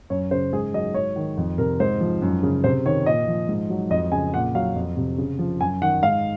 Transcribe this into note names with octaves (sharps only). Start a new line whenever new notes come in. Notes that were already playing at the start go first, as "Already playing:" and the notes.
F#2 C#5
C#3 C5
G#2 G#4
F#3 D#5
G#2 C#5
D#3
F2
C3 A#4
G#2 C5
F3
F#2
C#3
C3 C5
D#3 C#5
A#2 D#5
F3
G#2
F#3
F2 D#5
C#3 G#5
A#2 F#5
F#3 F5
F2
C3
C#3
F3
F#2 G#5
D#3 F#5
G#2 F5